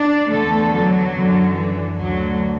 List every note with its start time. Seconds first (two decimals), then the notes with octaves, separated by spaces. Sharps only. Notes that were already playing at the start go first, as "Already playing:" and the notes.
Already playing: D4 D5
0.31 E2 D3 A3 A4
0.73 F#3
1.14 F#2 D3
1.55 E3
1.97 D2 D3 F#3